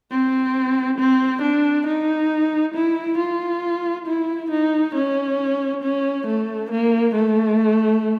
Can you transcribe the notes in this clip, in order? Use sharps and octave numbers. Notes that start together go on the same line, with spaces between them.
C4
C4
D4
D#4
E4
F4
E4
D#4
C#4
C#4
A3
A#3
A3